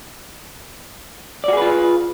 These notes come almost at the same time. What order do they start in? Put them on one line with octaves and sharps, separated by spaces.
D5 F#4 G#4 B4 F4